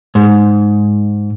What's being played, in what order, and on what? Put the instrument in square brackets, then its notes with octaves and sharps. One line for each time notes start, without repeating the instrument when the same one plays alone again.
[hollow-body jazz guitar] G#2